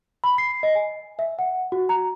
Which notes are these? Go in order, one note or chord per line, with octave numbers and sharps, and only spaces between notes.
B5
C7
D#5
G#5
E5
F#5
F#4
A#5